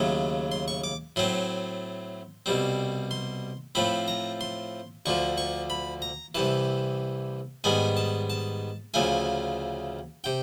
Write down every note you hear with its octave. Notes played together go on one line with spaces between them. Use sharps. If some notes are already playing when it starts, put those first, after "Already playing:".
Already playing: D#2 C#3 F#3 A3
C6
C#6
D6
A2 F#3 A3 C4 C6
C2 B2 G3 C4
C6
A2 F3 A3 C4 B5
A#5
C6
D2 D3 F3 C#6
C#6
B5
A#5
C2 C3 E3 A5
G#2 D#3 G3 B3 G#5
A5
A5
D2 C#3 F3 A3 G#5
C3 G5